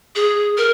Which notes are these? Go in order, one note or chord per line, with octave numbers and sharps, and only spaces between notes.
G#4
A#4